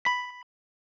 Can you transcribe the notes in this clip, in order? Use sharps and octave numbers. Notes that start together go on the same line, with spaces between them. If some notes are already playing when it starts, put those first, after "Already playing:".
B5 B6